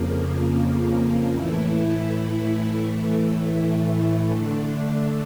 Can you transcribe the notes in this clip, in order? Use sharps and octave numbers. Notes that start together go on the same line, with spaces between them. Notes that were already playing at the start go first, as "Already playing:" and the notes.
Already playing: F2 C#3 F3 A#3
A2 E3 A3 E4
A2 E3 A3
D3 A3 D4